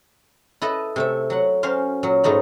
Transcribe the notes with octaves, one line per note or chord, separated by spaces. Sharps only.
E4 A4 B4 D#5
C3 A3 E5
F#3 F#5
F#3 C#4 C5 F5
A#2 F#3
G#2 F#3 A3 D#4 E4